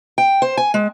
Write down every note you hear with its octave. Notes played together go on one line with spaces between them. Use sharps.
G5
C5
G#5
G#3